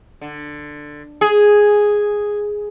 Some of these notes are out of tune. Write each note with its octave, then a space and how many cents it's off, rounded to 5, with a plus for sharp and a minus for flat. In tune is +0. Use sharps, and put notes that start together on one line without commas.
D3 +10
G#4 +0